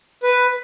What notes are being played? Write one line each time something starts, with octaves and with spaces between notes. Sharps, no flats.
B4